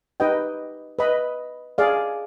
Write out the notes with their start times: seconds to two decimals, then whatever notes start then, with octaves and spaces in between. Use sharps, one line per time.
0.20 D#4 G4 B4 D#5 G5
0.99 B4 D#5 B5
1.78 G#4 D5 F5